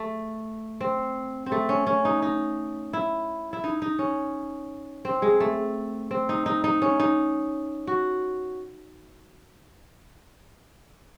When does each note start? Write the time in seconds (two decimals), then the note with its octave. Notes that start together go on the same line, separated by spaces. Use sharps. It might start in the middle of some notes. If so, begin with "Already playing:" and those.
Already playing: A3
0.80 C4
1.46 C4
1.52 A3
1.69 C#4
1.87 C#4
2.05 D#4
2.22 D#4
2.93 E4
3.53 E4
3.64 D#4
3.82 D#4
3.99 C#4
5.05 C4
5.22 G#3
5.40 A3
6.11 C4
6.29 D#4
6.46 D#4
6.64 D#4
6.82 C#4
7.00 D#4
7.87 F#4